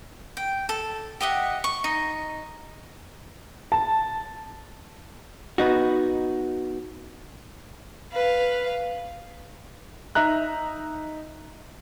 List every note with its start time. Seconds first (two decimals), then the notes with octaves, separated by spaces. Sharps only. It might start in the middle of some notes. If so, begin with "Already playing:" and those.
0.37 G5
0.69 A4
1.21 G4 D#5 E5 F#5
1.64 C#6
1.84 D#4
3.72 A5
5.58 B3 D#4 F#4
8.12 B4 F5
10.15 D#4 D#5 E5 A#5 F#6